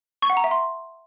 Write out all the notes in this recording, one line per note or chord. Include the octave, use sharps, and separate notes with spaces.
C#6
F#5
A#5
E5
C6